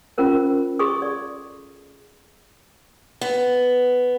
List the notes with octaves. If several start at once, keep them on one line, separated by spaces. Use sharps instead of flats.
C#4 F4 A#4 C5
G#4 A4 D#5 C6 C#6 D#6
D5
B3